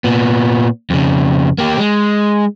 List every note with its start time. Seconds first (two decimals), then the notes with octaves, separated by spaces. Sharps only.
0.04 A#2 B3
0.90 F2 C#3
1.58 A#3 G4
1.79 G#3